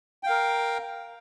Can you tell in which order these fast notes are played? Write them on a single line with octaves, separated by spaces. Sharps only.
G5 F5 A#4